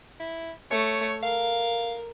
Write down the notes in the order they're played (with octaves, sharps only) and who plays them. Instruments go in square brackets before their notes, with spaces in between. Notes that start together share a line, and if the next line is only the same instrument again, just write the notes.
[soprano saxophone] E4
[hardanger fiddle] A3 [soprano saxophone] C#5
[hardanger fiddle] A#4 [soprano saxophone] F5